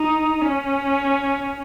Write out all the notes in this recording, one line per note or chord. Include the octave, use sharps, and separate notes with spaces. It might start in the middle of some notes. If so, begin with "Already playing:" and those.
Already playing: D#4
C#4